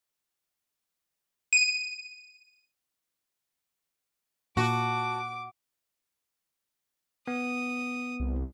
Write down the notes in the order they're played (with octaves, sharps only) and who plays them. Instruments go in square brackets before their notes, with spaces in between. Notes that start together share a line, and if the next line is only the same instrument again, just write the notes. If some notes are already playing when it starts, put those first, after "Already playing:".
[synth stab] D#7
[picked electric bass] A#2 [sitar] F#4 [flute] A5 [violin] D6
[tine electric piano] B3 [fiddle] D#6
[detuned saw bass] C2